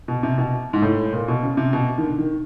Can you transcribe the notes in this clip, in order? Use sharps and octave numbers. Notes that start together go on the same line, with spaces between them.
B2
C3
B2
G#2
A2
A#2
B2
C#3
C3
B2
D#3
D3
D#3